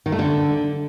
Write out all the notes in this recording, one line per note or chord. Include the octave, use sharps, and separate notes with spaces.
D#3
A3
D3